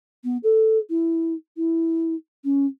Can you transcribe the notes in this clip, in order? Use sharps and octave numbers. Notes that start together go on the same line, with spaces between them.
B3
A4
E4
E4
C#4